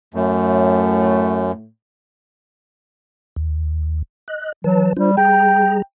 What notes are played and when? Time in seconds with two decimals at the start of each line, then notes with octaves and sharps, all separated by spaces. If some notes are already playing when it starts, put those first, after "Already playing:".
0.14 F#2 A2 A3
3.36 D#2
4.28 D#5 F#6
4.64 E3 F#3 B4 A5
4.97 G3 D4 F4 C5
5.17 G3 G#4 G5 A#5